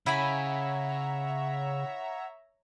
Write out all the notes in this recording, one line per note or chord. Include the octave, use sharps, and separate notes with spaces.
C#3 E4 C#5 E5 F#5 G#5 A#5 B5